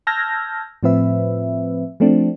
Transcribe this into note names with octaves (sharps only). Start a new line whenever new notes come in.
A5 E6 F6 G6 G#6 A#6
A2 F3 C4 B4 E5
F3 A3 C4 D4